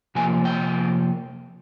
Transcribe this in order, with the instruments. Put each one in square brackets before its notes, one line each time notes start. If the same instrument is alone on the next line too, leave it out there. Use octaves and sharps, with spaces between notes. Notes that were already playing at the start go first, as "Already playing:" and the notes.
[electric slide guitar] C3 F3 A#3 G#5
G5